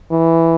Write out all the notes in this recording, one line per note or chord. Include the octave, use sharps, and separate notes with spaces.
E3